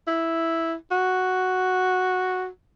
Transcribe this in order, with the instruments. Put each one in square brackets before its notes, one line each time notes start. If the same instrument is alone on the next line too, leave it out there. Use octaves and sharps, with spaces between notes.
[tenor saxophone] E4
F#4